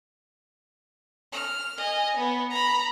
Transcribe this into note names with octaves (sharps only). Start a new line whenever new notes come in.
F6
D#5 G#5
B3
A#5 B5